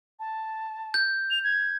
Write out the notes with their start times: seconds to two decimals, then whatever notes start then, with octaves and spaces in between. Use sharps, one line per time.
0.19 A5
0.94 G6
1.31 F7
1.44 G#6